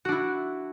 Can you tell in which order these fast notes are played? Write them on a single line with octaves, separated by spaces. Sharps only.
F#4 D4 E4